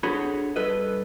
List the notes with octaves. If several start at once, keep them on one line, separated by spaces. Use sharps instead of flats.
D4 F#4 G#4 A4 C#5 B5
G2 A4 B4 D#5